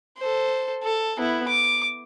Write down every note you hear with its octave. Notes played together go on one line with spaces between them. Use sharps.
A4 C5
A4
B3 E4
D6